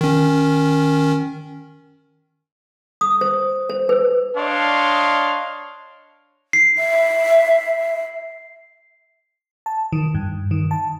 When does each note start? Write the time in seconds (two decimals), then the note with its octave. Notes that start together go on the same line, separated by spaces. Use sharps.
0.01 D#3 C#4
3.01 D#6
3.21 C5
3.69 C5
3.89 B4
4.36 D4 C#5 D#5 F5 C6
6.53 C7
6.78 E5
9.66 A5
9.92 D#3
10.15 G2
10.51 D#3
10.71 A5